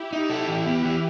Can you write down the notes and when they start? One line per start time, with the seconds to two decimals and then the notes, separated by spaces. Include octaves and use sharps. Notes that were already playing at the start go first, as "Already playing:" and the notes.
Already playing: E4 G4
0.12 D#4 E4 G4
0.30 A4
0.48 E3
0.66 B3
0.85 E3